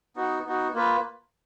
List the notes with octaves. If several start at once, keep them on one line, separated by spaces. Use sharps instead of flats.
B3 D#4 F#4
B3 D#4 F#4
A#3 F4 B4